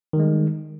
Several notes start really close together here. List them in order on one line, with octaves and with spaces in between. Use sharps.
D#3 G3 G#3